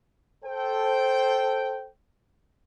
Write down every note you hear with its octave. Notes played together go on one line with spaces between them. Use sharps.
A4 C5 G5